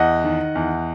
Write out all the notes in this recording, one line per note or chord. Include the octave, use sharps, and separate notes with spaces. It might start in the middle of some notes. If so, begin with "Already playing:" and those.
Already playing: E2 D#5 F#5
D#3
E2